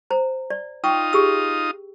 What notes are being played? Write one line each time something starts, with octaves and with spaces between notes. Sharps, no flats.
C5 A#5
D5
D#4 F4 G5 C#6 D#6
G4 G#4 E6